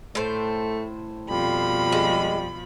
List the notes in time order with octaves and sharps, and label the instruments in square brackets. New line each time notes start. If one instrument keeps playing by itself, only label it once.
[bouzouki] A2 C5 [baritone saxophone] A3
[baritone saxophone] F2 [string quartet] B2 F3 B5 [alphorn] G3
[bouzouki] G#3